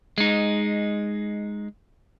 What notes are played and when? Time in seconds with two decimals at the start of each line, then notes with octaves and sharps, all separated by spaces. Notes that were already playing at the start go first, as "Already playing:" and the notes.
0.18 G#3 D#4